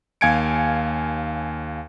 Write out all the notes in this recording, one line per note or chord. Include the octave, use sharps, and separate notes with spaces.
D#2 F5 G#5 G#6 C#7 D7